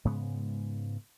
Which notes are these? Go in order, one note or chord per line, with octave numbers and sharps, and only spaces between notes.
G#2 C#3 G#3 B3